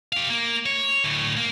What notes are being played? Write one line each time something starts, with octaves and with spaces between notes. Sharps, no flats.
G4 F5
A#3
C#5
D2 A2
A#3